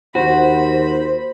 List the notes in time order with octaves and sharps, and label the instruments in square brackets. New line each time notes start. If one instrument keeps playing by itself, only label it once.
[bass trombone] D#2 [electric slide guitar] F#4 [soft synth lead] C5 [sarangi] B5